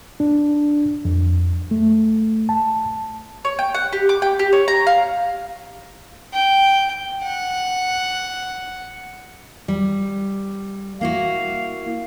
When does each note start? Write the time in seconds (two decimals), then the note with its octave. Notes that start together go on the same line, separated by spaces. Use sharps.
0.20 D4
1.05 F2
1.71 A3
2.49 A5
3.45 C#5
3.59 G5
3.74 F#5
3.93 G4
4.09 D6
4.22 G5
4.39 G4
4.53 C#5
4.68 A#5
4.87 F5
6.34 G5
7.23 F#5
9.68 G3
11.01 A#3 E4 F#4 F5